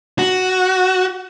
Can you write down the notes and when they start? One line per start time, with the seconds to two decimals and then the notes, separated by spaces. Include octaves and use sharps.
0.19 F#4